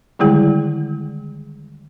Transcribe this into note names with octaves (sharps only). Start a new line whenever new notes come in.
D3 D#3 G3 G#3 E4 G#4